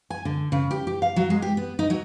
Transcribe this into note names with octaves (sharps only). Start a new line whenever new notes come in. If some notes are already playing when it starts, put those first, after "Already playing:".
G#5
D3
C#3
G4
G4
F5
F#3
G#3
G4
B3
D#4
F#3